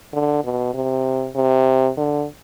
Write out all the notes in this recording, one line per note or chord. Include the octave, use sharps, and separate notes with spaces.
D3
B2
C3
C3
D3